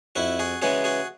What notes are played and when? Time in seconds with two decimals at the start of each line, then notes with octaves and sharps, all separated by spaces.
0.16 F2 E4 F#4
0.39 F#4 G#4
0.62 C#3 E3 G#3 F#4 G#4
0.84 F#4 G#4